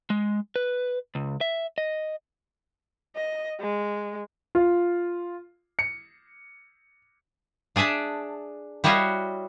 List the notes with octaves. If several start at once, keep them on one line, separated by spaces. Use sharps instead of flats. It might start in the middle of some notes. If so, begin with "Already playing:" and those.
G#3
B4
C#2
E5
D#5
D#5
G#3
F4
C#7
D4 G#4 D5 E5 A5
G3 E4 F#4 C#5 D#5 F5